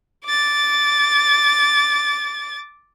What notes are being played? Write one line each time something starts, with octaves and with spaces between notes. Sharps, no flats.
D6 A6